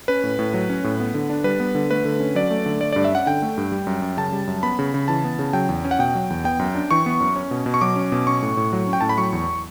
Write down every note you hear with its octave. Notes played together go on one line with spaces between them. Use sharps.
C#4 B4
A2
A2
F#3
C#4
A2
B3
D3
D4
G3 B4
B3
D3
A3 B4
D3
C#4
F#3 D5
A3
D3
A3 D5
G2 D5
E5
C#4 F#5
D3 G5
A3
G2
G3
F#2
F#2
C#3 A5
G3
F#2
B3 B5
C#3
C#3
E3 A5
B3
C#3
F#3 G5
E2
C#4
F#5
B2 G5
F#3
E2
B3 G5
F#2
D4
E3 C#6
B3
F#2
C#4
B2
B2
C#6
F#3 D6
C#4
B2
C#4 C#6
A2
A2
F#3
C#4
G5
A2 A5
B5
F#3 C#6
E2